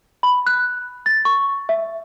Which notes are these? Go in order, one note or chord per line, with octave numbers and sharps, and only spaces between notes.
B5
F#6
A6
C#6
E5